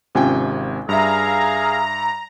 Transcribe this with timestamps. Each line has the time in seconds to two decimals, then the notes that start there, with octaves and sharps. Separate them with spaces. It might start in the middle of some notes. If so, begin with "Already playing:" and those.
0.15 G#1 C3 C#4 F4 G5 G#5
0.89 G2 G#4 E5 F5 A#5